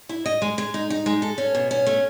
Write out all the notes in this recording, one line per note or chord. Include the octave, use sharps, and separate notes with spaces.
E4
D#5
G#3
G#3
D#4
D#4
G#3
A4
C#4
B2
C#4
A3